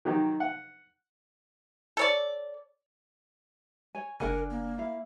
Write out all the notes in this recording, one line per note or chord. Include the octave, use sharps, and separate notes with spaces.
D#3 F#3 D#4 G4
F#5
A4 C#5 D5
C#5 G#5
F#1 D4 A#4 F#5 G#5
A#3
E4 F5